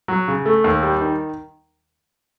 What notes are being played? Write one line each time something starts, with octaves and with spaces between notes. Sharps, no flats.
F#3
C#3
A3
D#2
G3
D#3